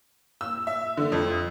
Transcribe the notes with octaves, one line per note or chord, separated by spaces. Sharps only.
E6
E5
D3
F2